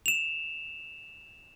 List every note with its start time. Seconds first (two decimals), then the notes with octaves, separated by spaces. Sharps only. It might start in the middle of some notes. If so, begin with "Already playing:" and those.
0.06 E7 F7